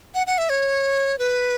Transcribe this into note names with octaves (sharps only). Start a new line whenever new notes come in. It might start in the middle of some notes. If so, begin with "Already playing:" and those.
F#5
F#5
E5
C#5
B4